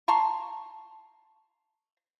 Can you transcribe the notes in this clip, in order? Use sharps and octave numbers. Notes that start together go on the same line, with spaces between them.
A5 A#5 C6 C#6